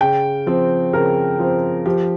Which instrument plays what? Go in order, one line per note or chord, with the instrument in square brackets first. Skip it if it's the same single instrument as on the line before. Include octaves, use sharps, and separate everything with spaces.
[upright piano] C#3 G5
F3 C4
C#3 A#4
F3 C4
F3 G4